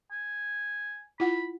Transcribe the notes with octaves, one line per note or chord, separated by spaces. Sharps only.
G#5
E4 F4 F#5 B5